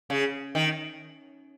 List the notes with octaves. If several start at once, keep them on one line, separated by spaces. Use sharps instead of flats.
C#3
D#3